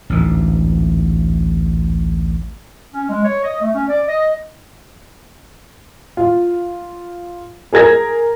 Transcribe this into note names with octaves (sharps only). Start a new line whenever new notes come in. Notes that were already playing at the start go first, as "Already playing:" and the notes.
A1 D2 G#2
C#4
G#3
C#5
D#5
A3
C#4
D5
D#5
F4
G#4 A#4 G#6 A#6